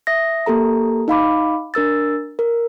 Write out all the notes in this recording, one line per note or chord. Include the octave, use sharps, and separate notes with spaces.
E5 D#6 A#6
A#3 G4 A4 A#5
D#4 F5 B5 D6
D4 A#4 E6 A6
A#4